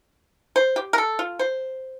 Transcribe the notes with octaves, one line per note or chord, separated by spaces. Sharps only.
C5
G4
A#4
A4
F4
C5